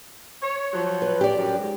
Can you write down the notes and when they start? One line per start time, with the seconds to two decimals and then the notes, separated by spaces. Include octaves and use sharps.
0.43 C#5
0.73 F3 F#3
1.02 B4
1.21 G4 D5
1.37 F#2
1.58 G#2